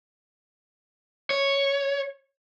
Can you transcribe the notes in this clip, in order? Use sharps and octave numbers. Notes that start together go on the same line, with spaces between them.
C#5